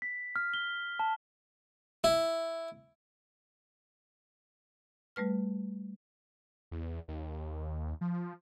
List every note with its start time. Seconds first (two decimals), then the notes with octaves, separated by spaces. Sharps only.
0.02 B6
0.36 F6
0.54 G7
0.99 A5
2.04 E4
5.16 G3 A3 B4 F6
6.71 E2
7.08 D#2
8.01 F3